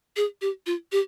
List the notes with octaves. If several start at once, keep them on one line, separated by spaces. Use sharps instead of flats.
G#4
G4
F4
G4